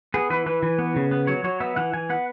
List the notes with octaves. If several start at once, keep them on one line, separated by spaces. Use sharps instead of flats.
B3 G#4
E3 B4
E3 B4
E3
B3
C#3
B3
F#3 C#5
F#3 C#5
B3 E5
E3 F#5
E3 G#5
B3 F#5